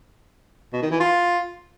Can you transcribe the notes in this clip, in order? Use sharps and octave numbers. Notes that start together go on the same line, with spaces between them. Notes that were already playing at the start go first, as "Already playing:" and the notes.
B2
D#3
E3
F4